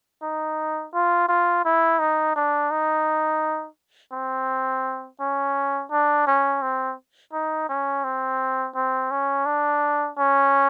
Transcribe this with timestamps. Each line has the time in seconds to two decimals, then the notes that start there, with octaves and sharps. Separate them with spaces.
0.22 D#4
0.94 F4
1.28 F4
1.65 E4
1.99 D#4
2.36 D4
2.71 D#4
4.12 C4
5.20 C#4
5.91 D4
6.27 C#4
6.62 C4
7.33 D#4
7.69 C#4
8.04 C4
8.75 C4
9.11 C#4
9.46 D4
10.18 C#4